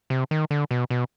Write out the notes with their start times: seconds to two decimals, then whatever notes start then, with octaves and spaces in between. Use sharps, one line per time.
0.10 C3
0.31 D#3
0.51 D3
0.71 B2
0.90 B2